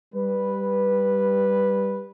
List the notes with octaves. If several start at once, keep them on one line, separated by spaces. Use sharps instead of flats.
G3 B4